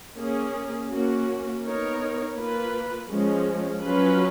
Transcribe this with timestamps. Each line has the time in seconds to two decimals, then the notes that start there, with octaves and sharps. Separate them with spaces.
0.17 A#3 C#4 G#4
0.90 A#3 C#4 F#4
1.63 B3 D#4 A#4 C#5
2.36 A#3 F4 B4
3.09 F3 G#3 C#4
3.81 F#3 C#4 F4 B4